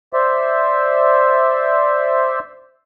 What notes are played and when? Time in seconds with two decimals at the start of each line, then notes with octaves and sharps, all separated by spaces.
0.13 C5 D5 E5